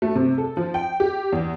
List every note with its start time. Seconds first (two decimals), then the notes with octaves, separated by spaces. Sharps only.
0.02 A3
0.15 C3
0.38 A4
0.57 F3
0.74 G5
1.00 G4
1.32 E2